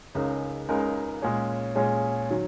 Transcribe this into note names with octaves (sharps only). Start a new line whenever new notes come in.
C#2 C#3 G#3 D#4 A#4
C#2 C#3 G#3 D#4 A#4
A#2 G#3 C#4 G#4 C#5
A#2 G#3 C#4 G#4 C#5
D#3 F#3